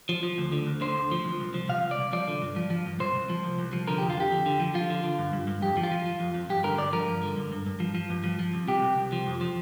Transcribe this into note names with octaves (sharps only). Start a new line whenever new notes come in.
F3
F3
D2
D3
D2
D3 C5
D2
F3
C2
C2
F3
C3 F5
C2
D5
C2
F3 D5
D3
G2
F3
F3
G2
C2 C5
C2
F3
C2
C2
F3
D3 A#4
F2 G4
F4
F2 G4
D3
D3
F3
F3 F4
D3
D3
G2
G2
G2
F2 G4
F3
F4
F3
F3
F2
F2
G2 G4
D3 A#4
G2 D5
F3 A#4
G2
D3
G2
G2
G2
F3
F3
G2
F3
F3
C2
C3 G4
C2
C2
F3
F2
F3